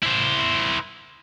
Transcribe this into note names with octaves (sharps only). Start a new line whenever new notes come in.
E4 C5